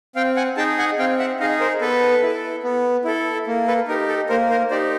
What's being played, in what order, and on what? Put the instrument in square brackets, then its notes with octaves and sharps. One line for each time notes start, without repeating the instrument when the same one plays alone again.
[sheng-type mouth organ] C4 F5 G5
F#5 G#5
D#4 G#4 G5 A5
F#5 G#5
C4 F5 G5
E5 F#5
D#4 D#5 F5
G#4
A#4 C5
B3 A4 B4
E4 A4
B3
E4 A4
A#3
A4 B4
D#4 A#4
G4
A4
A#3 A#4 C5
A#4 C5
D#4 G4 C5 D5